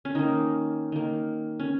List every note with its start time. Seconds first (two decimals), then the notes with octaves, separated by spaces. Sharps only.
0.05 C#4
0.15 D#3 A#3 D#4
0.92 D#3 A#3
1.60 C#4